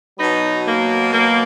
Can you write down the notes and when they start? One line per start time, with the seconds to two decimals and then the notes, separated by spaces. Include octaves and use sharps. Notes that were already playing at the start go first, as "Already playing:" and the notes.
0.19 B2 F#3 B3 D#4
0.66 A#3
1.12 A#3